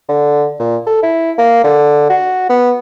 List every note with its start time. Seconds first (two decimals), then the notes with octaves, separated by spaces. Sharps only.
0.09 D3
0.59 A#2
0.86 A4
1.03 E4
1.38 A#3
1.64 D3
2.09 F#4
2.49 B3